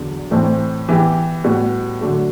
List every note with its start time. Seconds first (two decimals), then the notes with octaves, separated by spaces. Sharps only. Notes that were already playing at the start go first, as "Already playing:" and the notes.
Already playing: E2 D3 F#3
0.31 A2 E3 A3 C4
0.89 E3 B3 E4 G4
1.44 A2 G3 B3 F#4
2.01 D3 F#3 A3 D4 F#4